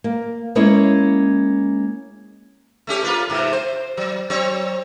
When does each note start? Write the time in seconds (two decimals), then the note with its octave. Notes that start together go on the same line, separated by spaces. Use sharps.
0.04 A#3
0.55 G#3 A#3 C#4 E4 C#5
2.87 A3 C#4 G4
3.03 A#3 F4 B4
3.30 G#2 C3
3.53 C5
3.97 F#3
4.30 F#3 C4 C#5